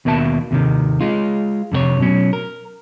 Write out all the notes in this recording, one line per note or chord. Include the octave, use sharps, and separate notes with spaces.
D#2 B2 A#3 E5 A5
D#2 C3 D#3
G#3 F4
F2 C3 G#4 C#5
B2 F#3 C#4
A#4